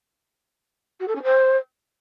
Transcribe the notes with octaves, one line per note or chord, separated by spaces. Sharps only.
F#4
A4
C#4
C5